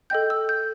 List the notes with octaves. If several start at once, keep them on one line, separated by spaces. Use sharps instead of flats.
A4 D#5 G5 G6
E6
G6